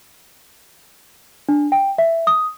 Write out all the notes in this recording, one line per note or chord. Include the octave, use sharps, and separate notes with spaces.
D4
G5
E5
D#6